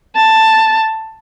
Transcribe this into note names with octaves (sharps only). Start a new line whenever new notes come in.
A5